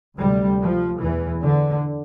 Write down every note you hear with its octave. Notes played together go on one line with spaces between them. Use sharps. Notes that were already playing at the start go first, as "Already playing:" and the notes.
D2 C3 G3
F3
E2 B2 E3
D3